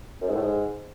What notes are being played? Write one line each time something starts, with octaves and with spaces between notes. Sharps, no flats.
F#2
G#2
A2
G#2